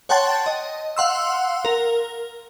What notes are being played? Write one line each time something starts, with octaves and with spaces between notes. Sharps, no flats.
C#5 F#5 G5 A5 C6 A6
D#5
F5 F#5 C6 E6
A#4